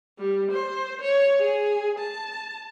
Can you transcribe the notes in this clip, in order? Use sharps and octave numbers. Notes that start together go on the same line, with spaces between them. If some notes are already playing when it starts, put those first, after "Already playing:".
G3
C5
C#5
G#4
A5